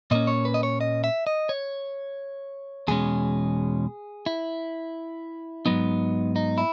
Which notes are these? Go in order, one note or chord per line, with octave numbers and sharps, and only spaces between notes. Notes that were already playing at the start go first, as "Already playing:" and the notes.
A#2 A#3 C#4 D#5
C#5
B4
D#5
C#5
D#5
E5
D#5
C#5
E2 B2 G#3 C#4 G#4
E4
G#2 F#3 B3 D#4
D#4
E4